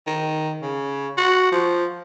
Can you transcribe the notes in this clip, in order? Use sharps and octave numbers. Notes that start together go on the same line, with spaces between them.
D#3
C#3
F#4
F3